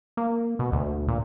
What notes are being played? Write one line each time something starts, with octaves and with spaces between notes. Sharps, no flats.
A#3
B2
D2
A#2